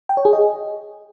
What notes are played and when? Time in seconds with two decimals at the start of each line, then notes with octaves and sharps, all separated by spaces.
0.09 G5
0.17 C#5
0.25 G#4
0.33 D#5